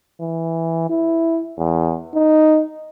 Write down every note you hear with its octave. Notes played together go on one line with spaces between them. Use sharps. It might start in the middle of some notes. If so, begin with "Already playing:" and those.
E3
E4
E2
D#4